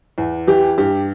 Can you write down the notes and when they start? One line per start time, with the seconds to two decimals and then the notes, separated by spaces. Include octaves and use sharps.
0.18 E2
0.47 E3 G4
0.78 G2 G4